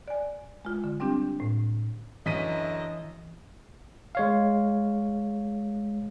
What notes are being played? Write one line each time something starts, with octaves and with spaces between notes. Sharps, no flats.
D5 G#5
G#3 F4
D3
G3 C4 D4 G4
A2
F#2 D3 E3 C#4 D#5 B6 D#7
G#3 C#5 F5